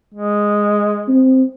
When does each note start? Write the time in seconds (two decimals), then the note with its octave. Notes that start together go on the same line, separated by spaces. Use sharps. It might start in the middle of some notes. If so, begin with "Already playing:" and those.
0.14 G#3
1.09 C4